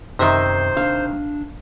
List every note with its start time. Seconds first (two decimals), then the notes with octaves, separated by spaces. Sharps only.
0.19 F#2 C3 D#3 C5 D#5 E5 A#5
0.77 D4 F5